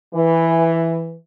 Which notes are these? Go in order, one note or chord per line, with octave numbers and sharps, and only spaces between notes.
E3